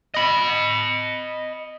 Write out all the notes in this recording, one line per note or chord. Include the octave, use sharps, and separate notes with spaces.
D#5 B5